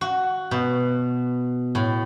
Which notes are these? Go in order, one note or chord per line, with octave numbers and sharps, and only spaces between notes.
F#4
B2
A2